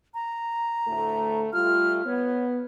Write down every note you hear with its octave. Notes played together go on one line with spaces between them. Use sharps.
A#5
D2 A2 A3
G3 A3 F4 F6
B3 C#5